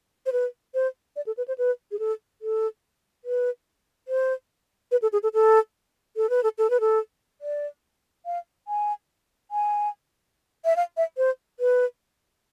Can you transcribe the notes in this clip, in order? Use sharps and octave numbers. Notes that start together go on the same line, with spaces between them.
C5
B4
C5
D5
A4
B4
C5
B4
G#4
A4
A4
B4
C5
B4
A4
G#4
A4
A4
A4
B4
A4
A4
B4
A4
D5
F5
G#5
G#5
E5
F5
E5
C5
B4